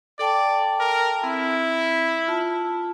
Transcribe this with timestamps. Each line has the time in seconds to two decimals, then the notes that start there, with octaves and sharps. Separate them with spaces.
0.19 A4 D5 G5 A5
0.80 A#4
1.23 C4 E4
2.28 F4 A5